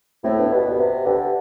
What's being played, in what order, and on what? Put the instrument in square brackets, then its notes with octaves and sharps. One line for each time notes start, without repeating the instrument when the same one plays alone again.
[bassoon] A2 [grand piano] A3 C4
[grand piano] B3 D4
[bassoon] B2 [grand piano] G4 B4
[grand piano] B4 D5
[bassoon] C3 [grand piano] G4 B4
[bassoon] D3 [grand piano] G4 B4